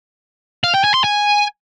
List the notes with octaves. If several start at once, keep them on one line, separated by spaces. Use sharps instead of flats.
F5
G5
G#5
C6
G#5